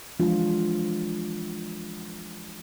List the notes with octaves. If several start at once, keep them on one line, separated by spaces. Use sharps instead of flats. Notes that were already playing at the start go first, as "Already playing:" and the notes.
E3 F3 G#3 D4 F4